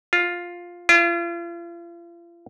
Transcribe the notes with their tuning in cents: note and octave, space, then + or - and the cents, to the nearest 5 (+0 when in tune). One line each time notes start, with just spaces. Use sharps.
F4 +5
F4 -40